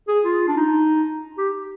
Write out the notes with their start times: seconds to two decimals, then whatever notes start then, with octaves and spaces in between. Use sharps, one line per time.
0.08 G#4
0.24 F4
0.48 D4
0.57 D#4
1.38 G4